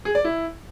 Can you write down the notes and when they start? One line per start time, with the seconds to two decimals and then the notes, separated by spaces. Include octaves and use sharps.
0.05 G#4
0.15 D5
0.24 E4